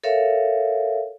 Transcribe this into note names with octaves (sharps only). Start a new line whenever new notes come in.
A4 A#4 C#5 E5 F5